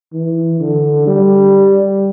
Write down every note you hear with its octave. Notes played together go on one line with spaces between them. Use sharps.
E3
D3
G3